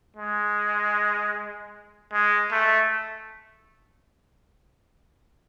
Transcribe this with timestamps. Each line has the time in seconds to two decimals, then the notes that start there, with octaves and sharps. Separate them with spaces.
0.16 G#3
2.13 G#3
2.51 A3